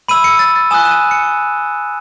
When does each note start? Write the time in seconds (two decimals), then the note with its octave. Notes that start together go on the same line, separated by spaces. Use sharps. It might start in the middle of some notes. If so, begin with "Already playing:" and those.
0.08 B5 E6 D#7
0.24 C#7
0.39 A6
0.56 A6
0.71 G#5 D#6 F#6 E7
0.85 E7
0.91 D#7
1.11 C#7